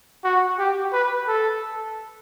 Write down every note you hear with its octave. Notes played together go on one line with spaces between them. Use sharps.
F#4
G4
B4
A4